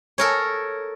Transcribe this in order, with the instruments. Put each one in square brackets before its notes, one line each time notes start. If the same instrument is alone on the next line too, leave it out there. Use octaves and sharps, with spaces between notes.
[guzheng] A4 A#4 C#5